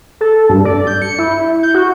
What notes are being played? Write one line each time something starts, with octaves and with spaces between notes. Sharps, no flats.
A4
G2
D5
G6
C#7
E4
G6
F#4